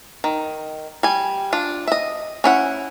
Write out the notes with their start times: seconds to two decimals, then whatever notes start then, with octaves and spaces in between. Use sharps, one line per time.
0.24 D#3
1.03 G3 G#5
1.53 D4 F4
1.87 D#5 E5
2.44 C#4 E4 F#5